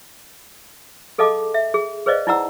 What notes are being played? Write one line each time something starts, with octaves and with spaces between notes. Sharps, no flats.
G#4 A4 D#5 F5 A5 D6
E5
G#4
G#4 B4 C5 D5 D#5 F5
D#4 E4 D5 F#5 A#5 E6